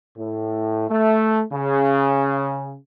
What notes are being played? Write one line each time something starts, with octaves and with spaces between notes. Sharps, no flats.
A2
A3
C#3